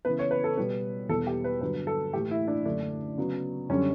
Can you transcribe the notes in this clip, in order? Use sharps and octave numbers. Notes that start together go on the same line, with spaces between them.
C#3 E3 B3 B4
C#5
B4
A4
B2 G3 B3 B4
E2 B2 G3 B3 A4
G4
B4
G2 D3 F#3 B4
A4
A2 E3 A3 G4
E4
D4
F#2 D3 A3 D4
C#3 F#3 B3
F#2 D3 G3 C#4